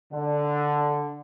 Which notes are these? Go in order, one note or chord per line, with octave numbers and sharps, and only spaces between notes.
D3